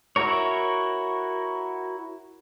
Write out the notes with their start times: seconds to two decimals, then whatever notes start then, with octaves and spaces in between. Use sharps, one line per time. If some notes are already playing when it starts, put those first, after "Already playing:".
0.16 E4 F#4 A#4 C#5